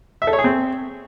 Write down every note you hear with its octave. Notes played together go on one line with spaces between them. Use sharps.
E5
A4
C#5
G#4
C4